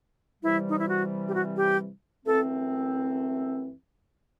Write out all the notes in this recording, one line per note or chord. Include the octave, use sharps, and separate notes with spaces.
C3 E3 G3 E4
D#4
E4
F#4
G4
F#4
G4
F#2 E3 A3 C4 A4